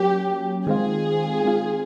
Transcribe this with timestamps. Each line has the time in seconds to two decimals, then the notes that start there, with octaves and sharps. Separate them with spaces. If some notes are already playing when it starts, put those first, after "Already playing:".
Already playing: F#3 A#3 C#4 G4
0.67 D#3 G#3 C4 F4 G#4
1.44 D#3 G#3 C4 F4